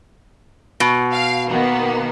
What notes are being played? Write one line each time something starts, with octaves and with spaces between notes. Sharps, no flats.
B2
F5
D#3 A#3 B3